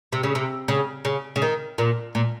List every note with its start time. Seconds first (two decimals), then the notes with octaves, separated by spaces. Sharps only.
0.12 C3
0.23 C#3
0.35 C3
0.68 C#3
1.05 C#3
1.36 C#3
1.42 D#3
1.78 A#2
2.15 A#2